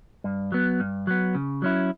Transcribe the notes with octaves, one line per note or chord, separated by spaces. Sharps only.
G2
F#3 B3
G2
F#3 B3
C#3
F#3 C#4 E4